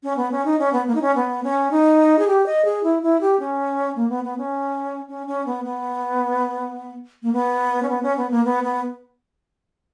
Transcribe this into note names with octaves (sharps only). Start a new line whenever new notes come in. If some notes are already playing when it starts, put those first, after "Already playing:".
C#4
B3
C#4
D#4
C#4
B3
A#3
D#4
C#4
B3
C#4
D#4
G#4
G4
D#5
G#4
E4
E4
G4
C#4
A#3
B3
B3
C#4
C#4
C#4
B3
B3
A#3
B3
C#4
B3
C#4
B3
A#3
B3
B3